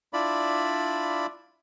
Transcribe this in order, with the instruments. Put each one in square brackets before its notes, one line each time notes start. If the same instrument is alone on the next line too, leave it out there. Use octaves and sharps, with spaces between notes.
[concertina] D4 E4 F4 D5 B5